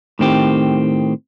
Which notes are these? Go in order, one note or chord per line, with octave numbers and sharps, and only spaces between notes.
A2 D#3 C4 G4